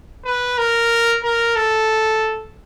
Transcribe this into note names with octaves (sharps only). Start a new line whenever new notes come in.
B4
A#4
A#4
A4